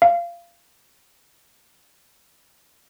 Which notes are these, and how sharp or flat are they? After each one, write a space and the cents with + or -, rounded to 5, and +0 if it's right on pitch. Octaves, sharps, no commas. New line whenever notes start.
F5 -20